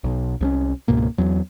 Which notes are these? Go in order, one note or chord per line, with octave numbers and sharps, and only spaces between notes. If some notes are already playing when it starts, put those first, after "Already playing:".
B1
C2 F#3 C#4
C#2 G#2 B2 A#3
E2 F#3